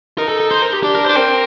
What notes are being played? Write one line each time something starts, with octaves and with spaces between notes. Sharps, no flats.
D#4 A#4
A4
A4
C5
A#4
G4
D4 G4
A#4
D4 C5
C4 A#4